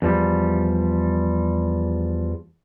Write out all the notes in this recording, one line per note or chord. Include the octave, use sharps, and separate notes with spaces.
E2 F3 G3